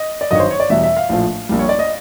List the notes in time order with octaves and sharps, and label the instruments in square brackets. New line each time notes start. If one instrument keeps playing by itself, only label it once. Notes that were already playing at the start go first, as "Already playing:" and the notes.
Already playing: [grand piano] D#5
D5
G1 G2 D#3 F#3 C#5 D#5
C5
C#5
D5
E2 B2 G3 E5
E5
F5
A#1 A2 F3
A#1 A#2 G3
C#5
D5
D#5